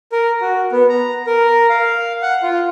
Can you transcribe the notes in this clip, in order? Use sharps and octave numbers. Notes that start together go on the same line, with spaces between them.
A#4
F#4
B3
A#5
A#4
F5
F#5
F4